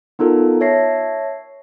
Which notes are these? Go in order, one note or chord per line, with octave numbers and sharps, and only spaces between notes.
B3 D#4 F4 A4 A#4
C#5 E5 A5 A#6 C7